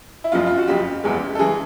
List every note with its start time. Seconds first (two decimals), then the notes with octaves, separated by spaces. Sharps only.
0.24 E4
0.32 F#1 F2 C#3 F4
0.47 F4
0.57 F#4
0.68 F#1 F2 C#3 G4
1.04 F1 E2 C#3 E3 G#3
1.35 A4
1.39 C#3 E3 G#3 G#4